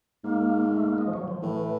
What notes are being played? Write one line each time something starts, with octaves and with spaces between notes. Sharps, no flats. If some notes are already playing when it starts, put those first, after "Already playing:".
G#2 A#3
A3
A#3
G#3
F3
F#3
F3
A2 E3